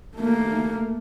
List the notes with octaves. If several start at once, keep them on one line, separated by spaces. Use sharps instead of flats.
A3 A#3